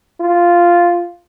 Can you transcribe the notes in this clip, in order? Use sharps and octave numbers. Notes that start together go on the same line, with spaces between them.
F4